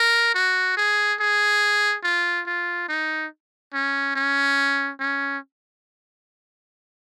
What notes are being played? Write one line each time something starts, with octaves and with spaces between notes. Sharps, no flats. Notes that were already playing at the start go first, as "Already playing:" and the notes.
Already playing: A#4
F#4
G#4
G#4
F4
F4
D#4
C#4
C#4
C#4